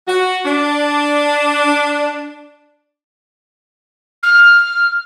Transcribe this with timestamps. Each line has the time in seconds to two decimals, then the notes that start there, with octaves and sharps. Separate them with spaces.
0.08 F#4
0.45 D4
4.23 F6